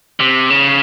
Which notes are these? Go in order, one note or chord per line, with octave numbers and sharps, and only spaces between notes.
C3
C#3